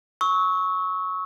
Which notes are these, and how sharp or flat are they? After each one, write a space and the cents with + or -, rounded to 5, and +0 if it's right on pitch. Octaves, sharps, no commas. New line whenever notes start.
C#6 +0 E6 -35